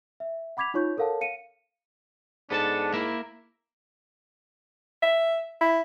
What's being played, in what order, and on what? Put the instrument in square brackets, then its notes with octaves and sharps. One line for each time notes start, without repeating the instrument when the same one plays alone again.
[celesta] E5
F#5 B5 D6 G#6 B6 F7
D#4 F4 C#5 C#6 G6
A4 A#4 C#5 F5 F#5 A5
F5 C#7 D#7
[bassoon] G#2 [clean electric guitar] B3 A4 A5 [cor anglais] D4
[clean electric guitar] A#3 A#4 E5 [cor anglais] E4
[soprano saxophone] E5
E4